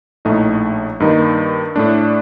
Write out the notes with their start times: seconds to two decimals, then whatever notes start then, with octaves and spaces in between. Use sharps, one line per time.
0.25 A#1 A2 A3 D#4
1.00 G2 D#3 A#3 D#4
1.76 A2 A3 D4